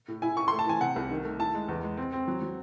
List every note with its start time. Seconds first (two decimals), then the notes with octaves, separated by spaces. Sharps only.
0.08 A2
0.22 E4 G#5
0.37 E4 C#6
0.48 A3 C6
0.59 A5
0.67 E3 G#5
0.81 C3 F#5
0.96 C2
1.11 D#3
1.24 A3
1.39 E4 A5
1.55 G#3
1.68 E2
1.83 G#3
1.97 C4
2.13 C4
2.28 F#3
2.42 F#3